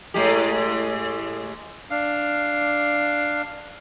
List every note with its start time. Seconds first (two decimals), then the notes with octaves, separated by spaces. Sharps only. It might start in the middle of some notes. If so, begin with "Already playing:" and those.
0.14 A2 G#3 G4
1.91 D4 F5